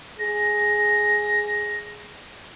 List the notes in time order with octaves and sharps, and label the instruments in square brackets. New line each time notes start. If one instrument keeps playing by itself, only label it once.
[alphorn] G#4 [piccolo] A#6